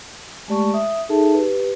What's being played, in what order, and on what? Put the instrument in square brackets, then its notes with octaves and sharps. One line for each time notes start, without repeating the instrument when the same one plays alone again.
[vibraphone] G#3 A3 G4 D5 A5 C#6
E5 D#6
D#4 G#4 A4 E5 A5
G4 B4